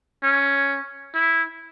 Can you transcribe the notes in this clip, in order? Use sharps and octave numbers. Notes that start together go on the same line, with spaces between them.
C#4
E4